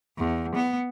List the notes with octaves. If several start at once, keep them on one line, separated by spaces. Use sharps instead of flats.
E2
B3